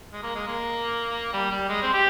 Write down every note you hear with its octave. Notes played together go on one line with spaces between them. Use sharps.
G#3
A#3
G#3
A#3
G3
G3
G#3
C4
G4